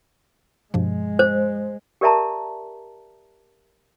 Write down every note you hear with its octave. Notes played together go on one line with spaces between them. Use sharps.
G2 B2 F3 G#3
C5
G4 A#4 D5 E5 A5 A#5